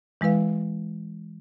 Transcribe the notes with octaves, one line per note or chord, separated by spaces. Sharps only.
E3 G#3 E4 B4 F5